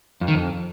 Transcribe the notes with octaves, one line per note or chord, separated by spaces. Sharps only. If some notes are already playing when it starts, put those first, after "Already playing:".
F2
D#3
F2